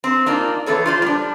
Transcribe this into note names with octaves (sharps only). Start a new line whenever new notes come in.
C4
A#3 D4 D#4 F4
E3 B3 A4 C#5
F4 C5 D5
G3 D4